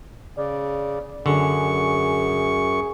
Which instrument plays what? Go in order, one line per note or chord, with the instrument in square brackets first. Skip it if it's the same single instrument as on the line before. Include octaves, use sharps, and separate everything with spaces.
[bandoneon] C#3 [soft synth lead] D5
[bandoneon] F#2 C#6 [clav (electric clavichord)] D3 [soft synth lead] G#4